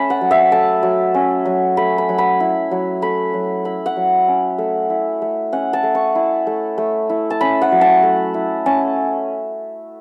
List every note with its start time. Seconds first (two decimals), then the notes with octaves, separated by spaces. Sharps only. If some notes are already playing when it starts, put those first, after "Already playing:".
Already playing: A3 C#4 A5 B5
0.10 F#5
0.21 F#3
0.31 E5
0.52 A3 A5
0.83 F#3
1.14 C#4
1.45 F#3
1.77 A3 B5
1.98 B5
2.09 F#3
2.18 B5
2.40 E4
2.71 F#3
3.02 A3 B5
3.34 F#3
3.65 E4 B5
3.86 F#5
3.96 F#3
4.28 C#4
4.58 A3
4.90 E4
5.22 A3
5.52 C#4 F#5
5.73 A5
5.83 A3
5.95 C#6
6.15 E4
6.47 A3
6.78 A3
7.09 E4
7.30 A5
7.41 C#4 B5
7.62 F#5
7.72 F#3
7.81 A5
8.03 A3
8.34 E4
8.66 C#4 A5